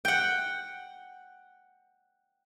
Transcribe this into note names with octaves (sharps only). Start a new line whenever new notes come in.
F#5 G5